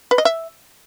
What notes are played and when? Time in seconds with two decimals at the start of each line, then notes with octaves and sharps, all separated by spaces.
0.11 B4
0.18 D#5
0.25 E5